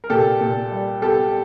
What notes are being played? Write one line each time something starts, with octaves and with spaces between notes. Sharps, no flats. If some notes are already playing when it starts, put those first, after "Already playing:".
A#4
A#2 G4 A4
A#2
G3
B3 G4 A4